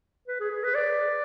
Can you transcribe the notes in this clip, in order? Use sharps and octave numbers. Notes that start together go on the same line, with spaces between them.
B4
G#4
G#4
B4
D5